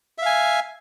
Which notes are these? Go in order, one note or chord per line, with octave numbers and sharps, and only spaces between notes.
E5 F5 G#5